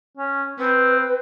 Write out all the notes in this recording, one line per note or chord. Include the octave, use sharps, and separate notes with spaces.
C#4
C4 B4